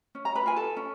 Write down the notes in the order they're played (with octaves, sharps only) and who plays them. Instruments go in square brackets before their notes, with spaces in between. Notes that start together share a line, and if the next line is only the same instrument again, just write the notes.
[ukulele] C#4
A#5
B4 B5
F4 A#4 G#5
A4 A5
C#4